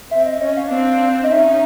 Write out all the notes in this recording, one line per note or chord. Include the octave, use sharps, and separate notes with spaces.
C4 E5
D#5
C#4 D#5
F5
C4 D4
D#5
C#4 D#4 E5